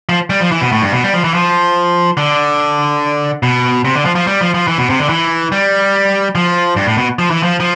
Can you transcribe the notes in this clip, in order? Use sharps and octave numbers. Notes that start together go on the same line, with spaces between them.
F3
G3
F3
E3
B2
A2
G2
B2
G3
F3
E3
F3
D3
B2
C3
D3
F3
F3
G3
F3
F3
E3
B2
C3
D3
E3
G3
F3
G2
A2
B2
F3
E3
F3
F3